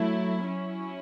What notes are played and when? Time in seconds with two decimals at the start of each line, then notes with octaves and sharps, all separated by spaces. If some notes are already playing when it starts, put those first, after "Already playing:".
Already playing: F#3 A3 E4
0.45 F#3 C#4 E4